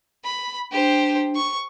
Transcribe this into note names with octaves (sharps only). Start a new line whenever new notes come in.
B5
D4 G4 C5
C#6